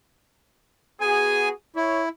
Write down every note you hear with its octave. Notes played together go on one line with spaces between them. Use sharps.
B3 F#4 G#4 G#5
E4 C#5